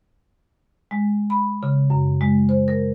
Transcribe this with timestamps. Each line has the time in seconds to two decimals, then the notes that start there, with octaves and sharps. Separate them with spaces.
0.91 G#3
1.30 B5
1.63 C#3
1.90 F#2
2.21 G#3
2.49 C5
2.68 A#4